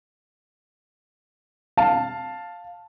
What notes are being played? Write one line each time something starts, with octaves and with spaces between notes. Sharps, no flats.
F5 A5